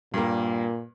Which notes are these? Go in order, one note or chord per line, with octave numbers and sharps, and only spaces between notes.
G2 A#2 A#3